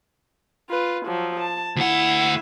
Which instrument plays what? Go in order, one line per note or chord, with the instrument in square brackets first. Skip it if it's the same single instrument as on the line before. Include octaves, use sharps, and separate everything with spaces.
[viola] F4 B4
F3 F#3
A5
[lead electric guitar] D2 F#5 [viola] E4 E5